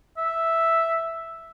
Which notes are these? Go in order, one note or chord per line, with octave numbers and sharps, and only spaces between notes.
E5